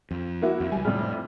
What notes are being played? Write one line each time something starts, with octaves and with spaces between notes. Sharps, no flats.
F2
A#3 E4 F#4
F2
C#2 G3 G#5
F2 A2 C3 G3